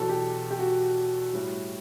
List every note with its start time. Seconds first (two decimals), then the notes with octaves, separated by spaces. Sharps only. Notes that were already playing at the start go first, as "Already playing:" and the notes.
Already playing: E2 B2 F#3 A4
0.09 G4
0.51 G4
0.59 F#4
1.33 A2 G3